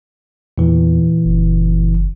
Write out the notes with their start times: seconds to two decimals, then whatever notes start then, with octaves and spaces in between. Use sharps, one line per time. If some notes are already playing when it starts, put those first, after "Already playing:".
0.58 E2 A#2 E3
1.25 F#1